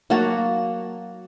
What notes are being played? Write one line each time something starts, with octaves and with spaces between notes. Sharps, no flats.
F#3 A#3 F#4 A5